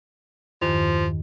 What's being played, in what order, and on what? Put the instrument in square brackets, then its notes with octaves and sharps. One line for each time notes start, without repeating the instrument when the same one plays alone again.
[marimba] E2 G2 D#3 [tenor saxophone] F3